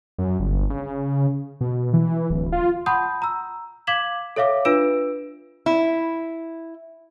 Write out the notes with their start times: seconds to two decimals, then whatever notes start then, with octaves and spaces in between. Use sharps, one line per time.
0.18 F#2
0.40 G1
0.70 C#3
1.61 B2
1.93 E3
2.30 D1
2.52 F4
2.86 F#5 A5 B5 C6 D#6 G6
3.22 A#5 E6
3.87 F5 D6 G#6 B6 E7 F#7
4.36 A4 C#5 E5 F5 D6
4.65 D4 F4 B4 E6 D7 E7
5.66 E4